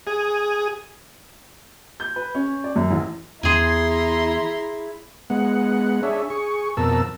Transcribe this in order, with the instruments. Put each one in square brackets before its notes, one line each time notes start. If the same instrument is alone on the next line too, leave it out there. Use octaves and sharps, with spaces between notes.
[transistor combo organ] G#4
[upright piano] G6
B4
C#4
D5
F#2
A1
[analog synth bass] E2 [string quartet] E4 [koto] G#4 G#5 [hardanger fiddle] A#5 C6
[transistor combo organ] G#3 B3 F#5
D4 G#4 C#5 E5
G#4 C#6
F2 B2 A#4 A5 E6